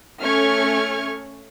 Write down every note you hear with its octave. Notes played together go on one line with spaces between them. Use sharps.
A3 C#4 A4 C#6 F6 G#6